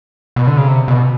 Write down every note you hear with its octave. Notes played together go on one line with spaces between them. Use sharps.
B2
D3
C#3
C3
B2